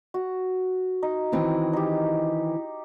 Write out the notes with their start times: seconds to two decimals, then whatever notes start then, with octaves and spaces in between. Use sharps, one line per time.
0.14 F#4
1.03 D#4
1.32 D#3 E3 C4
1.73 D#4 G4